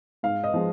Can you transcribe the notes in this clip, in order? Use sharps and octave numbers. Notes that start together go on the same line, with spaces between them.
G#2 F5
D#5
F3 G#3